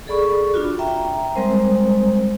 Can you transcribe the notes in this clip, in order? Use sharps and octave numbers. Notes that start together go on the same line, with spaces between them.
G#4 A4 D5 B5 C#6
D4 F4 F#4
E5 G5 A#5
G3 G#3 C4 A#4 C5